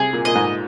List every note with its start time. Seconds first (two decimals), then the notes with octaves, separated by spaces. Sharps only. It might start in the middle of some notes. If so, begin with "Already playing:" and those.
Already playing: C3 G#4
0.13 A#2
0.25 A#2 D#5
0.35 G#2